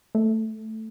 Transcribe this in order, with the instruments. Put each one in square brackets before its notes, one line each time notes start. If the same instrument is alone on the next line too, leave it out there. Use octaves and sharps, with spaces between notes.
[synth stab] A3